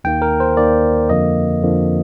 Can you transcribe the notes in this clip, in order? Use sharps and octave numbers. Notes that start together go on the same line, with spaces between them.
D#2 D#3 A#3 G5
A#4
C5
D#2 D#3 A#3 D5
F2 D3 F3 A#3 D#5
F2 D3 F3 A#3